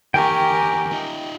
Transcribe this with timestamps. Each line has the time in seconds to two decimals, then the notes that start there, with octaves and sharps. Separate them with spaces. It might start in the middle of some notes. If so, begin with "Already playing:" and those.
0.14 E2 D#3 G4 A#4 G5 G#5 C#6
0.91 D#4 F4